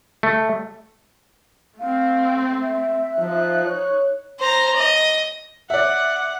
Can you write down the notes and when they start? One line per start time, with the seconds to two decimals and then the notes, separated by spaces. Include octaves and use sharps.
0.23 A3
1.80 A3 C4 F5
2.62 E5
3.18 F3 D#4 F#6
3.66 C#5
4.39 C5 A#5
4.76 D#5
5.70 D5 E5 F#5